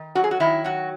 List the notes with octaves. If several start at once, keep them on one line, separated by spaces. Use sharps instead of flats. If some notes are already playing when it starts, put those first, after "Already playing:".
Already playing: D#3
F#3 F#4
G#4
F#4
D#3 E4
F#3 F#4